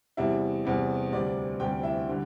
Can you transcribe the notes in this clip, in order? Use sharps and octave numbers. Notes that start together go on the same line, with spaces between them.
E2 C3 G3 E4 E5
E2 C3 G3
D2 C3 G3 D5
D2 C3 G3 G4 G5
E4 E5
D3 G3